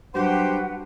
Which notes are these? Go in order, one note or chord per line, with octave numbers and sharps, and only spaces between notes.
F#3 G3 D4 F#4 G4 B4 C5 F#5